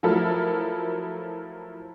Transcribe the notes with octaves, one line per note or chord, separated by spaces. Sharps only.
F3 F#3 A3 E4 A4 A#4